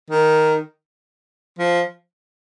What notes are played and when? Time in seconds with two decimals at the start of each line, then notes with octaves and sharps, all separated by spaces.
0.10 D#3
1.59 F3